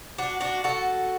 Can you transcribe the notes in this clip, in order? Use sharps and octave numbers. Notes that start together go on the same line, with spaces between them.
D4 F#4
D4 F#4
F#4 A4